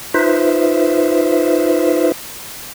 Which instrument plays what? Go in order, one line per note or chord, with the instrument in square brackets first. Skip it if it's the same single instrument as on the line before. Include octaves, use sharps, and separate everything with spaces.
[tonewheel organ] D#4 F4 B4 C5 E5